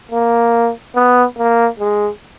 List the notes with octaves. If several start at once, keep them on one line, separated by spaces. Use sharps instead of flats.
A#3
B3
A#3
G#3